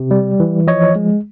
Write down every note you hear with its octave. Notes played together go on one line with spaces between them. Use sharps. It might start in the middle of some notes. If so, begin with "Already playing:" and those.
Already playing: C3
G3
E3
F3 C#5 D#5
G#3